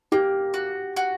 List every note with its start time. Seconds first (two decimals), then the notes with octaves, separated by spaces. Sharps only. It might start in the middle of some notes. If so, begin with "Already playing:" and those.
0.12 A#3 G4
0.54 F#4
0.96 F#4